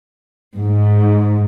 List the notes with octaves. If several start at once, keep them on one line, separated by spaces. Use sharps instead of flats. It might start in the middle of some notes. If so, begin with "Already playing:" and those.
G#2